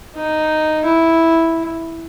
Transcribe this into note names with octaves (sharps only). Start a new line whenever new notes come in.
D#4
E4